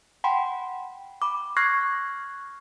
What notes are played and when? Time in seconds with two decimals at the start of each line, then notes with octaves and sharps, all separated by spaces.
0.24 F#5 G5 A5 B5 C6
1.22 B5 D6
1.57 C#6 F6 F#6 G#6 A#6 C7